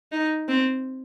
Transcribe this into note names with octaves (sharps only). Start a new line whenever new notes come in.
D#4
C4